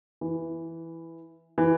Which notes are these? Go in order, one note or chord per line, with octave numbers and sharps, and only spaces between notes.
E3
E3